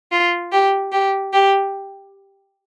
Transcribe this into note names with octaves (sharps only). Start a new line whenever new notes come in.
F4
G4
G4
G4